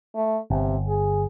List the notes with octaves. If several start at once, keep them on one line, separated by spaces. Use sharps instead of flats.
A3
G1 C3
G#4